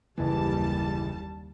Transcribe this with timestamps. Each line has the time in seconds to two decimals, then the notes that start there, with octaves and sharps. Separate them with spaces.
0.18 F#1 D#2 E3 G3 A5